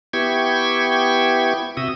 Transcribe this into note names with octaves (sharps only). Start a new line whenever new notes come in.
B3 E4 G4 G5 C#6 G#6
C3 F#4 E5 D#6